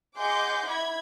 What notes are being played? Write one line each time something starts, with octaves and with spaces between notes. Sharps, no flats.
G#4 D#5 F#5 C6 D6 G6
E4 B5 G#6